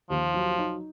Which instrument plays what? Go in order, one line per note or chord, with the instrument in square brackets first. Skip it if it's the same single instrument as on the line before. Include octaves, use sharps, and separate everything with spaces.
[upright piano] D#2 [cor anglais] F3
[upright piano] F#3
D#4